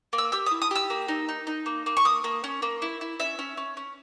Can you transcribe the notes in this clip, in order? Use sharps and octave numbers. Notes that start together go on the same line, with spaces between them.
A#3
E6
G4 E6
D#6
E4
D#6
G4 E6
A#3
D#4
D#4
D#4
A#3
A#3
C#6
A#3 D#6
A#3
C#4
A#3
E4
E4
C#4 E5
C#4
C#4
C#4